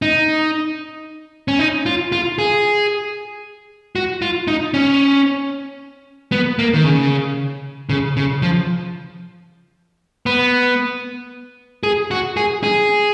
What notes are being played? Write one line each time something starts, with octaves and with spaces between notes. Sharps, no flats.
D#4
C#4
D#4
F4
F4
G#4
F#4
F4
D#4
C#4
B3
A#3
D#3
C#3
C#3
C#3
F3
B3
G#4
F#4
G#4
G#4